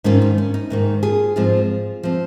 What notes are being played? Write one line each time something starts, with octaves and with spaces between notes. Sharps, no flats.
G#2 D#3 A#3 C#4 F4
D#4
C#4
D#4
G#2 D#3 A#3
F4 G#4
G#2 F3 C4 F4 G#4
F3 C4